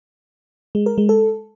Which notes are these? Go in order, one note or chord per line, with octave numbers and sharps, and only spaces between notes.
G#3
A#4
G#3
A4